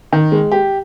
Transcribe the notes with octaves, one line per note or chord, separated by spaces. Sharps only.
D#3
G#3
G4